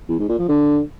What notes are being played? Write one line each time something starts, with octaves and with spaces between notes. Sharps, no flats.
E2
G#2
A#2
F3
D3